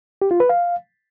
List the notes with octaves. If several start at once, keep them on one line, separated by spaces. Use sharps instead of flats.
G4
F4
B4
F5